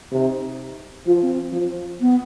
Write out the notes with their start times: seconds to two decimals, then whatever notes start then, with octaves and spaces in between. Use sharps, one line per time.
0.12 C3 D#4
1.06 F3 F4
1.22 C4
1.53 F3
2.00 B3